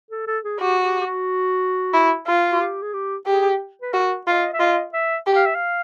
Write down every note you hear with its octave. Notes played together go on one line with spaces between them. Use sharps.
A4
A4
G#4
F#4 G4
G4
G4
F#4
E4
F4
F#4
G4
G#4
G4
G4 G#4
B4
F#4 A#4
F4 D#5
E5
F4 D#5
E5
G4
F5
E5
F5